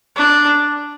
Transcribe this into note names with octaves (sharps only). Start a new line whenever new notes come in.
D4